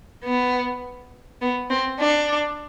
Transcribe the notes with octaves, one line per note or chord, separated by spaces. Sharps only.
B3
B3
C4
D4